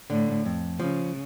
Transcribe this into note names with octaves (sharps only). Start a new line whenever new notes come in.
A2 D3
F2
C#3 F3